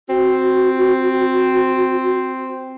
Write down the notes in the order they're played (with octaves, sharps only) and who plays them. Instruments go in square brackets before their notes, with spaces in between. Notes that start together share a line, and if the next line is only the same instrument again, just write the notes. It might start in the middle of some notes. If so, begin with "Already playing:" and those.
[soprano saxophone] C4 [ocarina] F#4